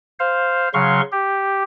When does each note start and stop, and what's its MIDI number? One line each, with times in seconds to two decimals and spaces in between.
0.20 0.69 72
0.20 0.69 77
0.74 1.01 49
0.74 1.01 54
0.74 1.01 77
0.74 1.01 84
0.74 1.01 85
1.12 1.63 67